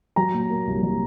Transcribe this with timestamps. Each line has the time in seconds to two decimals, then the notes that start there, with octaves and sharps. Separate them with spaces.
0.16 F#3 A#5
0.34 A#2
0.50 A#3
0.67 C2
0.83 F#3